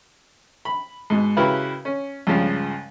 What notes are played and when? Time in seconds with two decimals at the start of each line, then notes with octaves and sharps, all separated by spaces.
0.65 B5
1.10 G#2 B2
1.37 C#3 E4 F#4 G4 A#4 B4
1.85 C#4
2.27 C#2 G2 C#3 F3